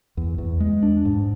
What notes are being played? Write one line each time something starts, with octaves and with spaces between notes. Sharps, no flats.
E2
E2
G#3
D4
G#2